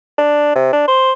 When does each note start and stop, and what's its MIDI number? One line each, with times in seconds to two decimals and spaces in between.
0.18 0.52 62
0.55 0.73 48
0.73 0.84 62
0.88 1.12 72